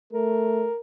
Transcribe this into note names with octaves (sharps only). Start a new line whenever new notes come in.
A3 A#4